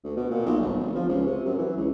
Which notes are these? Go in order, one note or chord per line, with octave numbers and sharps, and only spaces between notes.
D2
B2
A#2
B1
G1
F1
F3
C#2
C3
F#2
E3
C#2